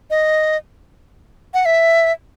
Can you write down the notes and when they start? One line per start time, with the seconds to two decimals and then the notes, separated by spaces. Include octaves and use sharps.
0.10 D#5
1.54 F#5
1.65 E5